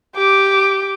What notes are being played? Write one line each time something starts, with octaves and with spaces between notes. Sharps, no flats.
G4 D6